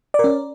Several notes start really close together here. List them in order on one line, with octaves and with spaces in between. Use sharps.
D5 A#4 C#4